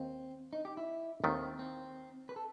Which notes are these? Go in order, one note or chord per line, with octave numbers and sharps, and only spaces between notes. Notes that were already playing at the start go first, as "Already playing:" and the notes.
Already playing: D#2 C4
D#4
G4
E4
D#2 D#3 A3 C4
C4
B4
A4